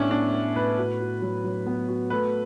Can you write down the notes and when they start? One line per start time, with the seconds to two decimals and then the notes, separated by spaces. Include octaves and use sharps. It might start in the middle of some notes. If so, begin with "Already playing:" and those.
Already playing: A2 G3 B3 C#4 D4 E4
0.11 B3 D4
0.33 B3
0.55 A2 B4
0.78 F#4
1.00 F#4
1.22 F#3
1.44 F#3
1.66 B3
1.88 F#4
2.10 A3 B4